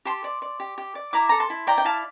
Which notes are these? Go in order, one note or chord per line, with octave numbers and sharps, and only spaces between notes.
G4 A5 C6
D5
D5
G4
G4
D5
E4 A#5 D6
A4 A#5
A5 C6
E4
D5 G5 A#5
G5
E4 F5 A5